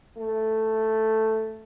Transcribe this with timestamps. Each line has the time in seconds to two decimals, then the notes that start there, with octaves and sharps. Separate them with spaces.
0.16 A3